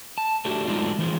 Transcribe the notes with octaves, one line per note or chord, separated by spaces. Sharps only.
A5
A3 D4 F#4 G4
F#3 G#3 A3 D4 D#4 F4
E3 F3 G#3